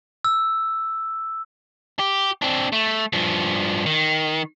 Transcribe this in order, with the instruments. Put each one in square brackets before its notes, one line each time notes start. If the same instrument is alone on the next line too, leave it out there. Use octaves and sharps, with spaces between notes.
[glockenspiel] E6
[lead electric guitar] G4
C4 D4
A3
G2 F3
D#3